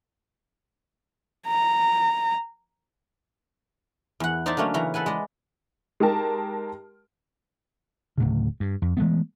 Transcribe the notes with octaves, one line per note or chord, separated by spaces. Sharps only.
A#5
E2 F#5
D#4 C5 D5 E5 A5
D3 F#3 A3 A#3 C#4
C#3 E3 A#5
A4 B4 F#5 G#5
G#3 D5 D#5
G#3 D#4 G4 A#4 A5
D1 A2 C#3
G2
F2
E3 G#3 A3 B3